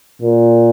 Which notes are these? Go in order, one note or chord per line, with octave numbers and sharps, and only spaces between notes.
A#2